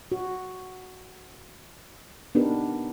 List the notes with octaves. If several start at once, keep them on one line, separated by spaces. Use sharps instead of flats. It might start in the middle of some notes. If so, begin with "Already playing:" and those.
F#4
B3 D4 D#4 G4 A#4 B4